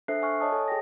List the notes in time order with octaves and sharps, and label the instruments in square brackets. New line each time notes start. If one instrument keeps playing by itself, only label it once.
[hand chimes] D4 A4 C5 E5 F#6 C7
F#5 G#5 C#6 F6 F#6
C#5 D#5 A5 D#6
A4 G#5
G#4 G5 A#6